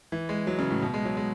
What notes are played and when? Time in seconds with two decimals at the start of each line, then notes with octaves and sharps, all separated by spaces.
0.12 E3
0.29 G#3
0.47 F#3
0.59 C#3
0.70 A2
0.83 B2
0.94 G#3
1.05 F#3
1.17 G#3